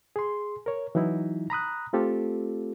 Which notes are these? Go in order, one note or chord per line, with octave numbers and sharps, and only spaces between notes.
G#4 C6
A#4 C#5
E3 F#3 D#4 E4
A#5 B5 D#6 F#6
A3 C4 F4 G4 A4